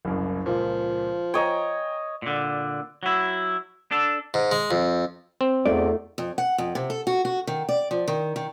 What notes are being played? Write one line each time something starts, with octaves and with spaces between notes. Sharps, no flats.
F#1 C2 F#2
C#2 A#2 F3
C#5 D#5 G5 G#5 A#5
A#2 D3
F#3 E4
D4 A4
G#2
G#3
F2
C4
E2 A3 D#4 F4 D5
F2
F#5
F2
C3
A4
F#4
F#4
D#3
D5
F3
D#3
D#3